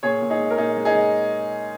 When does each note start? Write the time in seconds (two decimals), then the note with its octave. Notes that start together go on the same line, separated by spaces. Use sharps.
0.03 A#2 G#4 C#5
0.22 A#2
0.30 D#4 G#4
0.40 G#3
0.51 A#4
0.58 A#2 D#4 G#4
0.77 G#3
0.85 D#4 G#4
0.95 G#3